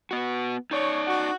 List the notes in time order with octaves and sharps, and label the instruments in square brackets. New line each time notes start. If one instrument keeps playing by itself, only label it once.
[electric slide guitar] B3 F#4
[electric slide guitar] D#4 D5 [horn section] C#5
[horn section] F#4